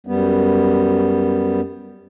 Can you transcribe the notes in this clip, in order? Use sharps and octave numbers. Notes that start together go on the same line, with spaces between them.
F#2 G3 B3